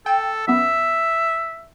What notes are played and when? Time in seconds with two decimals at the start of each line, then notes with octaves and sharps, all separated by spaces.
0.06 A4 G5
0.48 F#2 B3 E5